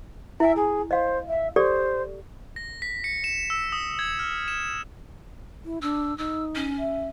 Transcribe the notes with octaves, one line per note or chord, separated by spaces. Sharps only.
E4 E5 G#5
G#4
C5 D#5 F5
E5
G4 A4 C5 D5
A#6
B6
C#7
E7
E6
D#6
G#6
F6
E7
E4
D4 E6
D#4 E6
C#4
E5